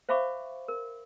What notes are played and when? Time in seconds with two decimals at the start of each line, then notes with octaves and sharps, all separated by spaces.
0.09 C5 E5 F5 B5 C#6 D6
0.68 A#4